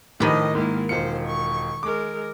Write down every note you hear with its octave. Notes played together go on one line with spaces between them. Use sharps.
A2 D#3 F3 G4 D#5 B5 D#7
G#2 A#3 E4
E1 F4 C5 C#7
C#6
G#3 A#4 D6